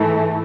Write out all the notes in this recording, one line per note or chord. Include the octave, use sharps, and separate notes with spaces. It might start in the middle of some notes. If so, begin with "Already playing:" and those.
Already playing: G#2 E3 A3